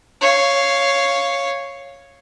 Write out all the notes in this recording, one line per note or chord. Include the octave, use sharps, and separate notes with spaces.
C#5 F5